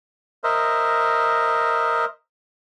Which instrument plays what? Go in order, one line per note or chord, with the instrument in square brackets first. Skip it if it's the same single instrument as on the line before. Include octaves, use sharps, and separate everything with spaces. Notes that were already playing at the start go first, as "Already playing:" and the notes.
[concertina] A#4 C5 D#5 E5